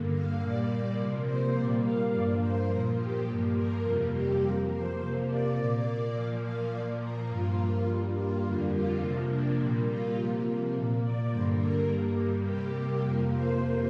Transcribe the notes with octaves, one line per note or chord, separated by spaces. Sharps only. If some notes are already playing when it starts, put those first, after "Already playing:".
Already playing: G2 D3 A#3
F5
A#2 G3 A#3 D5
C3 F3 A#3
C5
A#2 G3 A#3 D5
F5
G2 F3 A#3 D5
C5
A#2 F3 A#3 A#4
G4
G2 F3 A#3
A#4
F2 C3 G3 A#3 F4
G4
F2 F3 A#3 A#4
C5
C3 F3 A#3 C5
D5
A#2 A#3 D5
A#2 F3 A#3 F5
F5
A#2 F3 A#3 D5
A#4
G2 F3 A#3 F4
G2 G3 A#3
F4
F2 D3 G3 A#3 F4
F4
C3 F3 A#3 F4
D4
A#2 G3 A#3
F4
C3 F3 A#3 F4
A#2 A#3
D5
G2 D3 G3 A#3 C5
A#4
G2 G3 A#3
C3 G3 A#3 G4
F2 C3 F3 A#3 A#4
C5